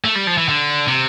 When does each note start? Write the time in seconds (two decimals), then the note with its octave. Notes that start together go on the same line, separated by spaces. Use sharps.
0.04 A3
0.15 G3
0.27 F3
0.38 E3
0.49 D3
0.88 C3